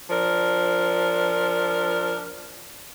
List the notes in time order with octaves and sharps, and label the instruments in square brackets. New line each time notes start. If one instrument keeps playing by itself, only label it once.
[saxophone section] F3 D4 A#4